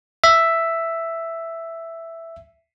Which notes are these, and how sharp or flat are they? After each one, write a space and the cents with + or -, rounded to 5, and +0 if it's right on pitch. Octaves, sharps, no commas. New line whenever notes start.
E5 +5